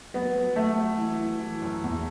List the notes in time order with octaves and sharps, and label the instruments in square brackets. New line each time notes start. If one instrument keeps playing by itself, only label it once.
[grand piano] F#3 [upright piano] B3
[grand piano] F#3
[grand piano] F#3 [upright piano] A3
[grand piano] F#3
E3
E3
E3
F#2
E2